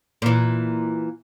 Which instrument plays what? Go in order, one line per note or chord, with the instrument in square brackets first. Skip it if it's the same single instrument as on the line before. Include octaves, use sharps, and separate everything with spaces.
[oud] A#2 E3